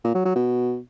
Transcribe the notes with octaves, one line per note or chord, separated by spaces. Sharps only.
A#2
F#3
F#3
B2